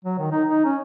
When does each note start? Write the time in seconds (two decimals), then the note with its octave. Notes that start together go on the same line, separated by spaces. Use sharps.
0.04 F#3
0.18 D#3
0.31 D#4
0.49 D#4
0.65 C#4